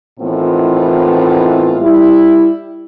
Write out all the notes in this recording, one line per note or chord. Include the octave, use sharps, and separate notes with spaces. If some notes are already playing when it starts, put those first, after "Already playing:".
A2 D#3 E3 B3 C4 F4
G3 E4